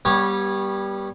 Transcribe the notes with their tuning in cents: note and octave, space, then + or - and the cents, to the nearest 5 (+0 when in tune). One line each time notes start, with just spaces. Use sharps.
G3 +0 B3 -30 C#5 -10